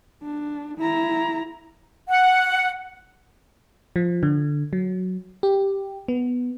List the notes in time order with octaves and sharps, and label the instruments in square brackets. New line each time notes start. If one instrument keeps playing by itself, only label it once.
[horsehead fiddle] D4
E4 A#5
[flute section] F#5
[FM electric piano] F3
D3
F#3
G4
B3